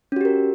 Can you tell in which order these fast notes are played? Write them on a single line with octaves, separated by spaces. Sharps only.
C#4 F#4 G4 A#4